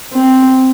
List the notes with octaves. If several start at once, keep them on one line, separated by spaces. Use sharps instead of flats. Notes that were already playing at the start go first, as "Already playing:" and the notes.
C4